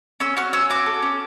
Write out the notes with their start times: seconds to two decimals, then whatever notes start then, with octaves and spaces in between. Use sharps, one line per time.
0.20 C#4 E6
0.37 F#4 F6
0.53 C#4 E6
0.70 F#4 D6
0.86 A4
1.02 C#4